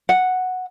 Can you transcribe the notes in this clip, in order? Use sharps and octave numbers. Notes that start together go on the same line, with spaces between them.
F#5